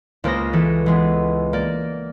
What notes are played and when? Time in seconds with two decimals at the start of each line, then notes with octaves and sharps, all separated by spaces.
0.24 C#2 A#3 C5 D#6 A#6
0.53 E3 A4 B4
0.86 E3 G#3 B3
1.53 A#3 D5